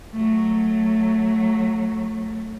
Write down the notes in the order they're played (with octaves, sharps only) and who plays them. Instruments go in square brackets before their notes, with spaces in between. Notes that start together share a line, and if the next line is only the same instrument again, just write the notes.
[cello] F#3 A3